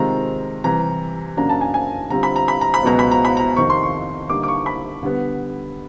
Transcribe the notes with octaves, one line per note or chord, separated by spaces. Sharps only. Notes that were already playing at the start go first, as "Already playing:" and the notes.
Already playing: C3 D#3 G#3 C4 F4 A#5
C3 E3 G3 A#5
F#2 C#3 F#3 A#3 D4 A#5
A5
G#5
G#5
D3 G3 C4 F4 A#5
B5
A#5
B5
A#5
B5
C#2 B2 F#3 B3 A#5
B5
A#5
B5
A#5
F2 C3 D#3 C#6
C6
C#6
D3 G3 A#3 D#4 D6
D6
C#6
B5
D3 G3 B3